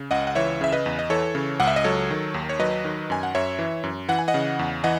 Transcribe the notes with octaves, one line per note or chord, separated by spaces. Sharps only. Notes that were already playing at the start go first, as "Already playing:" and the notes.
Already playing: C#3
C#2 D#5 F#5
F#5
E3 C#5 E5
C#3 E5
B4 D#5
E2
D#5
E3 A4 C#5
C#3
C#2 F#5
E5
D#5
F#3 A4 C#5
D#3
D#2
C#5
F#3 B4 D#5
D#3
F#2 G#5
F#5
F#2 C#5 E5
E3
F#2
E3 F#5
G#5
D#5 F#5
C#3
E2
E3 D#5 F#5